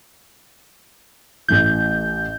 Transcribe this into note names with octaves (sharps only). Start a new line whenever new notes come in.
A1 A2 E3 G6